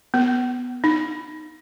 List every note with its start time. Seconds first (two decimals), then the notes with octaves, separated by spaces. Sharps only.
0.14 B3
0.84 D#4